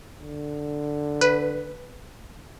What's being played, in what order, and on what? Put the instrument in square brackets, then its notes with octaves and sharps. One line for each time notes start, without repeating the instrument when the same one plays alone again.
[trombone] D3
[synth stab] B4